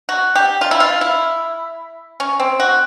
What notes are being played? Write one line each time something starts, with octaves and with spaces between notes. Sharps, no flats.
F#4
G4
F4
E4
F4
E4
C#4
C4
F#4